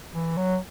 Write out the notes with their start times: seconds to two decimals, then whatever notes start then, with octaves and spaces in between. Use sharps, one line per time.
0.14 E3
0.37 F#3